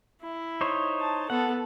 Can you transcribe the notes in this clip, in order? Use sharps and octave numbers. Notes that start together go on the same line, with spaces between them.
E4
D#4 C5 C#5
A5
B3 A4 F#5